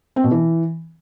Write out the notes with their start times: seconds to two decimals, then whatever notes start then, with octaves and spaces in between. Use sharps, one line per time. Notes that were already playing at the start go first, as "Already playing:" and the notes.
0.16 C4
0.24 B2
0.31 E3